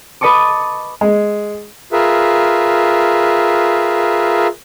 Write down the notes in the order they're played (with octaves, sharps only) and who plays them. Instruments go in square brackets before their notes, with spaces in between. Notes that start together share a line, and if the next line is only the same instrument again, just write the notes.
[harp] B4 D#5 A5 C#6 D6
[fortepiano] G#3
[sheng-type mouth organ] F4 G#4 A#4 B4 E5